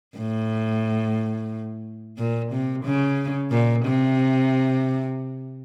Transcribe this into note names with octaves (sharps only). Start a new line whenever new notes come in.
A2
A#2
C3
C#3
A#2
C3